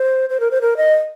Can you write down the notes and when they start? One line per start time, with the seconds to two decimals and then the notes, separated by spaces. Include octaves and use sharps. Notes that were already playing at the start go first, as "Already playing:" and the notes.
Already playing: C5
0.30 C5
0.40 A#4
0.51 C5
0.61 A#4
0.77 D#5